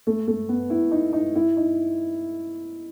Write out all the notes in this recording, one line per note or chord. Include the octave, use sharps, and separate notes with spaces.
A3
A3
B3
E4
D#4
D#4
E4
D#4